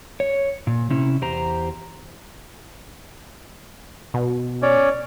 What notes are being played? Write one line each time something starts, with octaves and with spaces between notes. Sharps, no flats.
C#5
A#2
C3 C#4 E4
E2 G4 C5 A#5
B2
C#4 C#5 D5